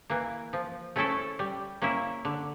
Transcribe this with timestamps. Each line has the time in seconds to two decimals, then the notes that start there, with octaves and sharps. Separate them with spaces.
0.10 E3 A#3
0.53 F3
0.96 A3 C#4 E4 A4
1.39 G3
1.82 A#3 C#4 E4
2.25 D3